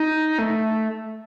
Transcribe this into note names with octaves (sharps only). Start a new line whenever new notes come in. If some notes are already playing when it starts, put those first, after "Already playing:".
Already playing: D#4
A3